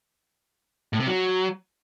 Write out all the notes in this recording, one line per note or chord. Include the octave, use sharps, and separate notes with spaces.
A2
C3
F#3